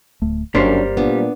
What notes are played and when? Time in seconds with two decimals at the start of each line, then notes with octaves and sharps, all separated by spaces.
0.22 D1 D2 A3
0.55 G1 F#2 G3 A#3 C#4 D4 C5
0.97 A#2 B3 D4